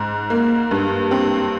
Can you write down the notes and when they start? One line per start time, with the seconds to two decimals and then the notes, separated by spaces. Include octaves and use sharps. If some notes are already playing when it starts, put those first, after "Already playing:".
Already playing: G#2
0.30 A#3
0.71 G2
1.11 C4